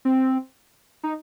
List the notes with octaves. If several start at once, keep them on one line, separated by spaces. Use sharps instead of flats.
C4
D#4